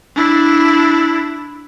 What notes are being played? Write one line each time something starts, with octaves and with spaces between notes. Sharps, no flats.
D4 E4